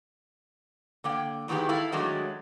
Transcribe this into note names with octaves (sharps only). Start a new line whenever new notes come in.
D3 A#3 G5
E2 G#2 D#3 E3 G4 G#4
E4 A4 F5
D#3 F#3 G#3 A3 D4